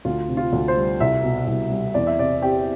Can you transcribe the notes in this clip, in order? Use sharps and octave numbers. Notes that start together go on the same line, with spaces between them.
D2 F4
C3
F4
D2
C5
G3
C2 E5
B2
C2
G3
E2 D5
E5
C3 D5
C4 G4